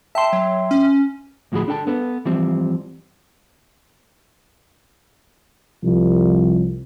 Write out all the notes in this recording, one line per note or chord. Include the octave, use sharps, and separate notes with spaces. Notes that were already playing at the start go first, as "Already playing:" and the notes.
E5 G5 A5 C6
F#3
C#4
D2 A2 F3 F#4 G#4 B5
D4 A4 G5 A5
B3 A4 B4
E3 F3 G3 C4
C2 F3